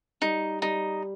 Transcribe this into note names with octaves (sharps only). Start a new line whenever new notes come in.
G3 D#4
G3 D#4